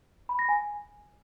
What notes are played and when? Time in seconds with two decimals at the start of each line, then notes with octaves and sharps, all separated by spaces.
0.29 B5
0.39 A#6
0.49 G#5